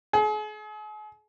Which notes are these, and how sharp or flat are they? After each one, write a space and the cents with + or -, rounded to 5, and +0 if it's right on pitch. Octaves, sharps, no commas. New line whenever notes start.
G#4 +40